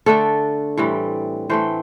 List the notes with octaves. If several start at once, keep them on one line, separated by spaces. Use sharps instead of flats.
D3 A3 D4 A4
A2 E3 G3 C4
E3 A3 C4 C5